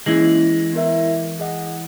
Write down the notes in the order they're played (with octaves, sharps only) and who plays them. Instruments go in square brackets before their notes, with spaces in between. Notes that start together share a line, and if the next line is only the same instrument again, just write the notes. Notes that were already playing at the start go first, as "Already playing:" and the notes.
[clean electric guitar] E3 G#3 [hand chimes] A#3 C#4 E4 G#4
[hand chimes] B3 E4 A#4 E5
G#4 D#5 F#5